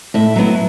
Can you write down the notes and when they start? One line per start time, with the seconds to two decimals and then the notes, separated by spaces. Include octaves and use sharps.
0.14 A2 E5
0.36 F#3 B3 E4